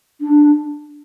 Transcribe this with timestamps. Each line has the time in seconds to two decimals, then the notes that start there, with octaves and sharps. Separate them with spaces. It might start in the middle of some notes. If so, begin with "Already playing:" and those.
0.21 D4